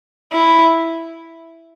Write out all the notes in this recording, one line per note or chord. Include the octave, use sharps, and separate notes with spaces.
E4